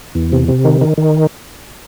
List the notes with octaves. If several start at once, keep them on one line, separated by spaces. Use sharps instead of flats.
E2
C3
C3
D#3
D#3
D#3